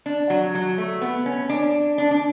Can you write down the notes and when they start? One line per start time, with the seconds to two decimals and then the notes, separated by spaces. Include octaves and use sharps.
0.06 D4
0.30 F#3
0.55 F#3
0.78 A3
1.01 B3
1.26 C#4
1.49 D4
1.98 D4
2.11 D4